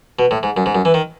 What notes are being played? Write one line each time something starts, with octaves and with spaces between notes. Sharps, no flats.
B2
A2
G#2
F#2
G#2
F#2
E3
D#3